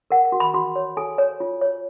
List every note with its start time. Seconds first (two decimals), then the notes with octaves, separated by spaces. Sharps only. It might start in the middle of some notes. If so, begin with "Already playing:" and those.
0.11 A#4 F#5
0.25 F#5
0.32 F#4
0.40 B5
0.54 F#4 C6
0.76 C#5
0.97 A4 G#5
1.18 C#5
1.40 F4
1.61 C#5